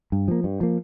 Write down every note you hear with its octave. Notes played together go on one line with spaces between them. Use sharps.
G2
F3 A#3
G2
F3 A#3